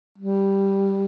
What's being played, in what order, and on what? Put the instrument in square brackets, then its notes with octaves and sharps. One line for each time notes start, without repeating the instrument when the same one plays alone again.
[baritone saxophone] G3